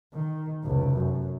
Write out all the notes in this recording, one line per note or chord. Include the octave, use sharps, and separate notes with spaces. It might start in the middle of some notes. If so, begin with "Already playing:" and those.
D#3
F1 C#2
F#2